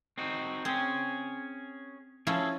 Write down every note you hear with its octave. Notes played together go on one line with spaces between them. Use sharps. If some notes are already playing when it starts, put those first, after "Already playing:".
C4 D#4 F#4
C4 C#4 G#4
F3 C#4 E4 G#4 A4